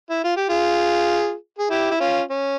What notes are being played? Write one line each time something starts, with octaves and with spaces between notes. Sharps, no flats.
E4
F4
G4
F4 G#4
G#4
E4 G4
E4
C#4 F4
C#4